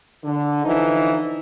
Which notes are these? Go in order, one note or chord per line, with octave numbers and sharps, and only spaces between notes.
D3
D3 E3 F3 D#4